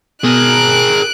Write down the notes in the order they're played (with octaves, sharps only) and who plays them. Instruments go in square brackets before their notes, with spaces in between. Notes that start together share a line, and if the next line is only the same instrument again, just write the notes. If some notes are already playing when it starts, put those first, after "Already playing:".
[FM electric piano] B2 [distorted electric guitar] G#4 A#4 [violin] F#6 D7